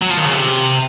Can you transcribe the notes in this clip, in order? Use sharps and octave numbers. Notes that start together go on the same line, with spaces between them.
F#3
F3
D#3
C#3
C3